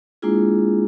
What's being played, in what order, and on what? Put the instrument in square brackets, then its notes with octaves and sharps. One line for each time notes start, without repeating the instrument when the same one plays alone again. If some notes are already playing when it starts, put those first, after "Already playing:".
[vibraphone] G#3 A#3 D4 E4 F4 G#4